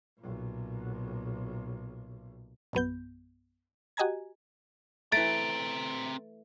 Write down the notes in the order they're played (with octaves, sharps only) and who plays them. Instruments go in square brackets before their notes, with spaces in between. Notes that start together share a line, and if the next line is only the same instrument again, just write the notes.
[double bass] B1 A#2
[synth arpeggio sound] A#1 F#2 B3 G6
F#4 G4 D#5 G#5 A#5 G#6
[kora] E3 A3 [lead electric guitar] C4 A#5 [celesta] A6 [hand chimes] D7